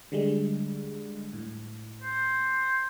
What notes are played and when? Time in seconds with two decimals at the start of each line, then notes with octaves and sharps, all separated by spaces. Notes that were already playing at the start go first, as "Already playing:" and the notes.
0.12 D3 G3 G#3
1.33 A2
2.02 C5